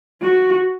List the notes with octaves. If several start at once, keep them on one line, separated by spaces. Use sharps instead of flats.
F#4